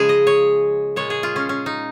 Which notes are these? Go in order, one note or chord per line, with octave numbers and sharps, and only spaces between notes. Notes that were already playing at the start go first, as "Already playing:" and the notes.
Already playing: C#3 F3 G#3 G#4
D#5
C#5
A#2 G#3 C#5
G#4
F4
C#4
C#4
D#4